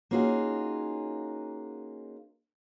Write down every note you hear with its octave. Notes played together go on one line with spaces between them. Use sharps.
A#3 C#4 D#4 F4 F#4 G#4